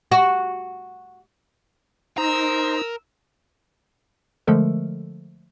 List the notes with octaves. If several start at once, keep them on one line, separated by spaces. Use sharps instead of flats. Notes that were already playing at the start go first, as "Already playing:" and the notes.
F#4
D#4 A#4 C5 E6
D3 F3 G#3 A3 A4 A#4